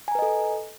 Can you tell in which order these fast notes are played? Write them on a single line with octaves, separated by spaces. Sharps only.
G#5 A#5 B4 D#5 A4